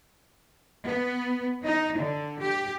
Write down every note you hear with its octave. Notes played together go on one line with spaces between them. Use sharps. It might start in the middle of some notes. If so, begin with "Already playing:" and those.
B3
D#4
D3
G4